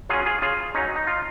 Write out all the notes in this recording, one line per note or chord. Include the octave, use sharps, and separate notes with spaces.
F#3 C#4 F4 G#4
F4 G#4
C#3 F4 G#4
F#3 C#4 D#4
D#4
F4